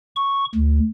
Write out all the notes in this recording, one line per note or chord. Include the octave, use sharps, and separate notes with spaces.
C#6
D2